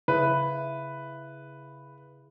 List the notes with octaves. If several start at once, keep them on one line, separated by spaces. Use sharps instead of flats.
C#3 E4 B4